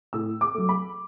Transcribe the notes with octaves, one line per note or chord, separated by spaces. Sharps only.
A2 E6
D6
F#3 A3
B5